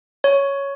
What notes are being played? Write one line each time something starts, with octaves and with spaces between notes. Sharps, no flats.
C#5